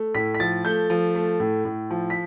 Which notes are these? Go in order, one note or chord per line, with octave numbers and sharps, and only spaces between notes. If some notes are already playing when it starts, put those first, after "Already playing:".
Already playing: A3
A2 B6
B6
F3 A6
A3 G6
F3
A3
A2
A2
F3
B6